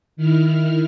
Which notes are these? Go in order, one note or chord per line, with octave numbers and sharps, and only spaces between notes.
D#3 E4 F6